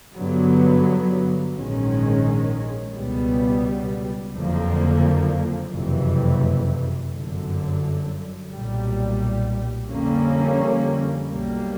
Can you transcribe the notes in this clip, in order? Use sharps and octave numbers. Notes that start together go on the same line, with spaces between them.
G2 D3 F#3 B3
A#1 G#2 D#3 G#3 C#4
C#2 B2 G3 B3
F#1 F2 D3 F3 A#3
F#1 F2 C3 E3
G1 F#2 D3
B1 A#2 G3
F2 D3 G3 A#3 C#4
B1 B2 G3 A#3